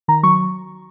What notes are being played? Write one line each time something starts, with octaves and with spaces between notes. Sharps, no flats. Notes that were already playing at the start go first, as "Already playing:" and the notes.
D#3 A#5
F#3 C#6